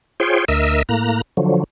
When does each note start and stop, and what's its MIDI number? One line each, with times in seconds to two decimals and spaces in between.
0.20 0.45 65
0.20 0.45 68
0.20 0.45 72
0.20 0.45 73
0.20 0.45 79
0.48 0.82 38
0.48 0.82 70
0.48 0.82 75
0.48 0.82 76
0.48 0.82 88
0.89 1.21 45
0.89 1.21 58
0.89 1.21 82
0.89 1.21 90
1.37 1.64 50
1.37 1.64 53
1.37 1.64 54